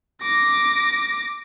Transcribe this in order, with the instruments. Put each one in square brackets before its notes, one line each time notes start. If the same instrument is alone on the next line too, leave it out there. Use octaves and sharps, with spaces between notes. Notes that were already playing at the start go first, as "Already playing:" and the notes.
[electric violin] D6 A#6